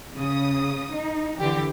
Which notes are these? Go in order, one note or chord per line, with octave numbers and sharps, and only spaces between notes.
C#3 D#6
D#4
D3 E3 G4